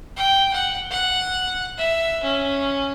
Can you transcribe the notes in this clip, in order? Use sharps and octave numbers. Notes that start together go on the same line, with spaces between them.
G5
F#5
F#5
E5
C#4